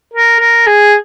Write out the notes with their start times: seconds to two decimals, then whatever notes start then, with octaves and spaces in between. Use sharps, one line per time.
0.14 A#4
0.40 A#4
0.67 G#4